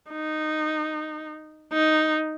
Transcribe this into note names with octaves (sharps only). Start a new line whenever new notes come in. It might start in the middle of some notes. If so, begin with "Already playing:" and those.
D#4
D#4